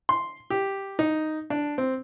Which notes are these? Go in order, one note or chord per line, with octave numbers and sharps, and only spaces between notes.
C6
G4
D#4
D4
C4